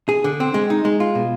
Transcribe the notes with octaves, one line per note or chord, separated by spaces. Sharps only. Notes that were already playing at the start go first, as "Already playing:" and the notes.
G#4
D3
C4
G#3
D#4
G#3
F4
B2